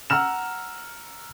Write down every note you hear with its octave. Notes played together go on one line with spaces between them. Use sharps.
F#5 A#5 E6 F6 E7